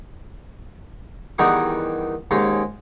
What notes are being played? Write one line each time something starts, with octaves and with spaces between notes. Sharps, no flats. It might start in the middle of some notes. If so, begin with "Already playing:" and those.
E2 D#3 G3 D#4 F#5 C#6
D#2 G#2 C#4